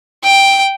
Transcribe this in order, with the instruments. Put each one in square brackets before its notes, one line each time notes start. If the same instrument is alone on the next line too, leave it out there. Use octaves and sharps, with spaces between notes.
[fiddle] G5